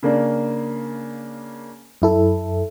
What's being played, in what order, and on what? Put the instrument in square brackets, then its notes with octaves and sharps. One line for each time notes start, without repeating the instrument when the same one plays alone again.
[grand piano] C#3 A#3 D4
[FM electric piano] F#2 E4 A4